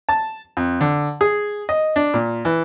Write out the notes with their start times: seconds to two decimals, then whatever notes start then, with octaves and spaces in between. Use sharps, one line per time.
0.09 A5
0.57 F2
0.81 D3
1.21 G#4
1.69 D#5
1.96 D4
2.14 A#2
2.45 E3